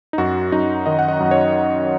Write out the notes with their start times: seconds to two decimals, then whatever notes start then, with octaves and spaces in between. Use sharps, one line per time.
0.13 D#4
0.18 F#2 F#4
0.52 F#2 D#4
0.86 D#3 D#5
0.99 F#5
1.08 D#5
1.20 F#2
1.31 C#5